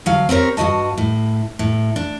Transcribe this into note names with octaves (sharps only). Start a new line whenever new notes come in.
D2 F#3 F5
C4 G4 A#4 C#5
G2 C#3 F#4 D#5 A5
A2
A2
D4